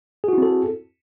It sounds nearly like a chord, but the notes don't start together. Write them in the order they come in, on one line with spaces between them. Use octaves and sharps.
G#4 F#4 E4 C4 A4